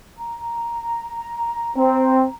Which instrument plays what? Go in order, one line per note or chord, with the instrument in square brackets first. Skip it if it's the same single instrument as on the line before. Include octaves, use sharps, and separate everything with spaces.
[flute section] A#5
[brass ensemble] C4